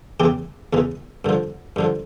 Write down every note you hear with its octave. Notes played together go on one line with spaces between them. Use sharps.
E2 C#3 E3 G4
E2 C#3 E3
G2 D3 F3
G2 D3 F3